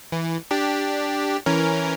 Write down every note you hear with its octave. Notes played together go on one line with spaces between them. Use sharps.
E3
D4 G4
E3 C#4 A#4